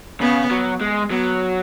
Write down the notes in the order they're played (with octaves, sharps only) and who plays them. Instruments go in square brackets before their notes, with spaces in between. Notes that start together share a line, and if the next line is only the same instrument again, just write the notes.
[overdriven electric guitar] C#3 [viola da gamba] B3
[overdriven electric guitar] F#3
G#3
[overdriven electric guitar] F#3 [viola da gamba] B3